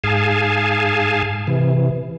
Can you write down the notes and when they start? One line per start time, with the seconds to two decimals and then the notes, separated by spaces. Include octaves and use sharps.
0.04 G#2 G#4 F5 G#5 A5
1.47 C3 E3